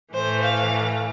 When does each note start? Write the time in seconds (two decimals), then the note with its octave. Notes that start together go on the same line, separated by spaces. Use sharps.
0.14 A2 E3 A3 C5
0.44 F5